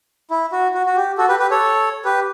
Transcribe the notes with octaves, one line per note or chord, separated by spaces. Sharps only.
E4
F#4
F#4
F#4
G4
F#4 A4
G4 B4
G4 B4
A4 C#5
G4 B4